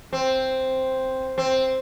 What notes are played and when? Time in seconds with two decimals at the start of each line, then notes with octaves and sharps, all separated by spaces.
0.13 C4
1.38 C4